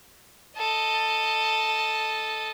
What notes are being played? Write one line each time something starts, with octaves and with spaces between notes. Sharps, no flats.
A4 D#5